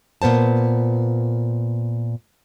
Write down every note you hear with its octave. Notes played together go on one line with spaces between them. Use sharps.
A#2 B3 C5 A5